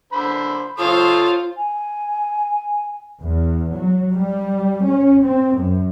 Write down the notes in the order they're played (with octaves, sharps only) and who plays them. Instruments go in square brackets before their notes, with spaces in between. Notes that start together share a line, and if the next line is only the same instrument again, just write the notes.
[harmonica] D3 C5 B5
[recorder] F4 [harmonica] A4 C#5 D#6 [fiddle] C5 F5
[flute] G#5
[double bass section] E2
F#3
G3
C#4
C4
F#2